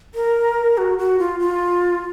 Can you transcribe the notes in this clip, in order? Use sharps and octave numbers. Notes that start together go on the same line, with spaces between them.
A#4
F#4
F#4
F4
F4